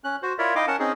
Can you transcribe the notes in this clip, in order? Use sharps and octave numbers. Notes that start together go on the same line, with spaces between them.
C#4 F#6
F#4 C5
E4 F4 A#4 C#5 D5 E5
D#4 E4 D#5 F5 G5 D6
C#4 A#4 F#5 A5
C4 C#4 D#4 G#4